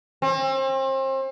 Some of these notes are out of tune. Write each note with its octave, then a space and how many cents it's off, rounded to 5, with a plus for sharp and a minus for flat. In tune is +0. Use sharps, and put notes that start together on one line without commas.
C4 +35